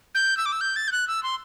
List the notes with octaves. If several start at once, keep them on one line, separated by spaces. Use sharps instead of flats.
G6
E6
D6
E6
G6
A6
G6
F#6
E6
C6